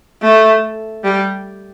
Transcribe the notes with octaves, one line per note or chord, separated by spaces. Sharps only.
A3
G3